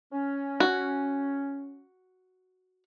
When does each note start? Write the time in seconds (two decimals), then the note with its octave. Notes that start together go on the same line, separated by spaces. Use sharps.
0.13 C#4
0.60 F#4